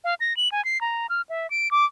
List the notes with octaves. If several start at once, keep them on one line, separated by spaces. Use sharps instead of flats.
F5
A#6
F#7
G#5
C7
A#5
F6
E5
D7
D6